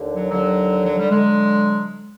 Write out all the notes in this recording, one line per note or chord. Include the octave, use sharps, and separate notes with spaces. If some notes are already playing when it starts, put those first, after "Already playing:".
Already playing: D#2 D3
F#3
D#2 D3 F#3
F#3
G3
D3 F#3 G#3